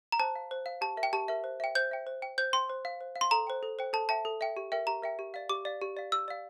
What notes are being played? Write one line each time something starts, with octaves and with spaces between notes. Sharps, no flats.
A#5
C5 A5
F5
C5
F5
G4 A5
A#4 E5
G5
G4 A5
A#4 E5
C5
E5 G5
C5 G6
E5 G5
C5
G5
C5 G6
G5 C6
C5
F5
C5
F5
C6
A4 A#5
C5 G5
A4
C5 G5
A4 A5
E5 G5 A5
A4
E5 G5
G4
A#4 E5 G5
G4 A#5
A#4 E5 G5
G4
D5 F5
G4 D6
D5 F5
G4
D5 F5
G4 E6
D5 F5